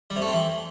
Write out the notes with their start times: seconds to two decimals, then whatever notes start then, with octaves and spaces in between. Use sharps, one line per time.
0.10 G3
0.16 C3
0.22 A3
0.27 C4
0.33 E3